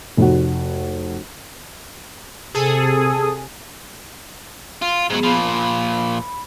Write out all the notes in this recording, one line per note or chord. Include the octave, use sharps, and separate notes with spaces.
F1 F#4
C3 G#4 A4 D#6
F4
G#2 F#3 B3 G#4
A#2 F3 B5